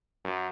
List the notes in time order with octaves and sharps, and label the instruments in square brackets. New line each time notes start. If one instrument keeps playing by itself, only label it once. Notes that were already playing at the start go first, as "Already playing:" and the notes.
[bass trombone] F#2